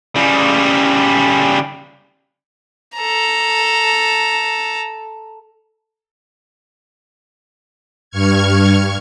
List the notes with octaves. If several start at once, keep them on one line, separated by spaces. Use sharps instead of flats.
C#3 G3
A4 A#5
G2 C#6 F6 G#6